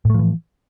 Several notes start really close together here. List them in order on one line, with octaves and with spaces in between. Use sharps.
A2 A3 F3 E3